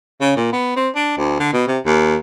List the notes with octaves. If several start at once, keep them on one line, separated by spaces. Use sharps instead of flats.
C#3
A#2
B3
C4
D4
D2
D3
B2
C3
D#2